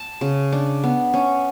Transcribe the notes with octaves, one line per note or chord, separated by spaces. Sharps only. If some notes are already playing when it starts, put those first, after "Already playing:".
Already playing: A5
C#3
D4
B3
C#4